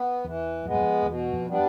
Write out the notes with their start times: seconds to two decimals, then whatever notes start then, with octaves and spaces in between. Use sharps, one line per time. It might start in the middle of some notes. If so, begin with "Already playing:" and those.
Already playing: B3
0.24 E2 E3
0.65 F2 G#3 B3
0.74 F#2
0.81 F2
1.06 E2 B2
1.33 F2
1.47 G3 B3 D4